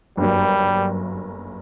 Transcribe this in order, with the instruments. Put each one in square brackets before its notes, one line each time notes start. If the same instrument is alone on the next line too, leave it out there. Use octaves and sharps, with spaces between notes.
[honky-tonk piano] G1 F#2 F#3 A#3 [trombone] G3